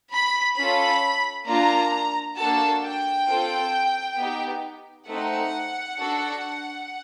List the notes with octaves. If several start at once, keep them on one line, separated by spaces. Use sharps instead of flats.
B5
C#4 F4 A4 B5
A#3 D4 F4 A#5
A#3 D4 F#4 A4 A5
G5
C4 F4 A4
B3 D#4 G4
A3 C4 D#4 F#5
D4 F#4 A4